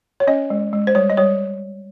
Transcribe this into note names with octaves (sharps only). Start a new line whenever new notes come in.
C#5
C#4 D#5
G#3
G#3
C5
G3 C#5
D#5
G3 C#5